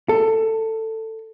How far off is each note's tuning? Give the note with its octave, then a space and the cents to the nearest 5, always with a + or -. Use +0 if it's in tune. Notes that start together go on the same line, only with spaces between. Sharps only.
A4 +15